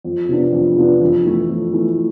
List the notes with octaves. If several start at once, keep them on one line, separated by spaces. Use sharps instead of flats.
F2
C3 F3 B3 D4
F2
C3 F3 B3 D4
F2
E3 A3 E4
F2
E3 A3 E4